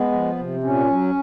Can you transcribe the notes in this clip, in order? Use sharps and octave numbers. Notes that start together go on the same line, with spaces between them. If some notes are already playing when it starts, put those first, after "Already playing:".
Already playing: G#3 B3
F3
C3
A#2 C#4
F#3